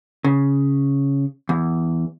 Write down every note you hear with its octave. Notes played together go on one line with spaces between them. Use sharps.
C#3
E2